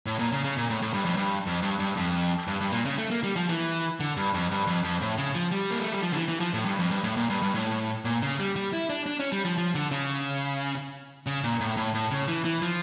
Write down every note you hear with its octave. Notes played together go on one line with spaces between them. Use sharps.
A2
A#2
C#3
C#3
A#2
A2
A2
G2
F2
G2
F2
G2
G2
F2
G2
G2
A#2
C#3
A3
A#3
G3
F3
E3
D3
G2
F2
G2
F2
F2
A2
C#3
F3
G3
A#3
A3
G3
F3
D3
E3
E3
F3
A2
G2
F2
G2
A2
A#2
G2
G2
A2
A#2
C#3
G3
G3
E4
D4
D4
C#4
G3
F3
F3
D3
C#3
C#3
A#2
A2
A2
A2
C#3
E3
E3
F3